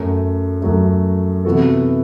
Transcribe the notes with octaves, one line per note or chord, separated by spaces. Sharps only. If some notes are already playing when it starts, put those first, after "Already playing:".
Already playing: F#2 F#3 A3
F#2 F#3 A3
C3 E3 B3 F#4 A4